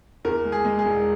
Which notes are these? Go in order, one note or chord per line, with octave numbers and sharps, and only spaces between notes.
E2 A#4
G#3
G#4
G#3
G#4
E1